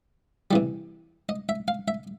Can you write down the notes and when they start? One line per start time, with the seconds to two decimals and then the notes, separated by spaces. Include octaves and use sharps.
0.51 C3 E3 G3
1.29 D#5
1.49 E5
1.68 F5
1.88 E5